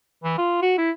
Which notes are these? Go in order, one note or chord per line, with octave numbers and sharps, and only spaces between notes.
E3
F4
F#4
E4